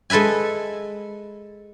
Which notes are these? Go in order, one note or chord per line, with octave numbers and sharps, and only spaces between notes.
G#3 A4 B4 E5 G#5